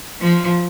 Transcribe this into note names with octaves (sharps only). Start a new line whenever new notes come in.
F3